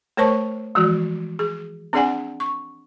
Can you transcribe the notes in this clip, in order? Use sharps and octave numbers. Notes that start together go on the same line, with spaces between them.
A3 A#4 C5 C#5 A5 C#6
E3 F3 G#3 F#4
G#4
C4 D4 G#4 D5 F#5 G#5
C#6